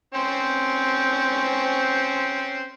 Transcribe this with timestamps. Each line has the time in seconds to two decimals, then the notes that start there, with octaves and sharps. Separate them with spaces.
0.14 C4 C#4 C5